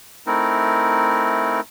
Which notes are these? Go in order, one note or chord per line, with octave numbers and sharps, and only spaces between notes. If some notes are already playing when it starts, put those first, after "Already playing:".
A3 C4 D#4 E4 A#4